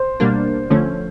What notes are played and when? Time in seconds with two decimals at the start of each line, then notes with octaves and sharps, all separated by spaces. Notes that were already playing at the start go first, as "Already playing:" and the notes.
Already playing: C5
0.20 B2 G3 A#3 D4
0.70 D3 F3 A3 C#4